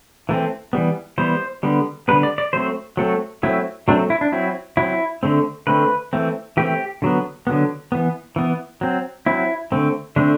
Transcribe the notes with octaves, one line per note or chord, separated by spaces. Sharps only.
E3 A3 C4
E3 G3 B3
E3 G3 B3 C5
D3 G3 B3
D3 G3 B3 B4
D5
D5
F#3 A3 C4 C5
F#3 A3 C4 A4
F#3 A3 C4 E4
F#3 A3 C4 D4
E4
D4
F#3 C4 E4
F#3 C4 E4
D3 A3 C4
D3 A3 C4 B4
E3 A3 C4
E3 A3 C4 G4
D3 F#3 B3
D3 F#3 B3
E3 B3
E3 B3
F#3 C4
F#3 C4 E4
D3 A3 C4
D3 A3 C4 D4